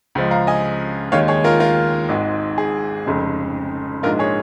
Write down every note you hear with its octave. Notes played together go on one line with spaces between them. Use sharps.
C#2 C#3 F3 G#3
F5 A#5
D#5 G#5
D#2 D#3 G#3 C#5 F5
G#4 C#5
F4 A#4
F4 A#4
G#1 G#2 G#3
G#4
F1 F2 C#3 G#3
A#1 G#2 G#3 F4 A#4
G#4 C#5